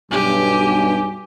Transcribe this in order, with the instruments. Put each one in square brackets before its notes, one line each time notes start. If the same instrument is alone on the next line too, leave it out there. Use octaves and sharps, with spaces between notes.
[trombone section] B1 G2 [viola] G4 [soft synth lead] G#5